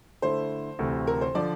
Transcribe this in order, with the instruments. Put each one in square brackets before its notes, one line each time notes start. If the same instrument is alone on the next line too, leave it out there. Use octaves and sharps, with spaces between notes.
[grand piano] D3 A3 E4 [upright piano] C5
[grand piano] D2 C3 E3 A3
[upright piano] A#4
C5
[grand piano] D3 F3 [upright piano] D5